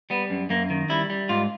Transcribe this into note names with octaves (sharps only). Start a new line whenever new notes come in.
G3 B3
F#2
F#2 A#3
D#3
G3 E4
G3
G#2 F4